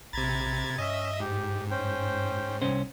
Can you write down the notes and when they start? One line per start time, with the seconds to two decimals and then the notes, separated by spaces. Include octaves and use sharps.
0.13 A#1 C3 A#5 B5 G#6 A6
0.78 G2 C#4 D#5 E5
1.20 G#2 G4
1.71 C#4 C5 G5
2.62 C2 C#4 C5